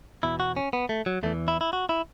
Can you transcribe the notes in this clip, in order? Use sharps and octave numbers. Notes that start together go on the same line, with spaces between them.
E2 B2 E4
F#4
C#4
B3
A3
F#3
E2 E3 A3
E4
E4
F#4
E4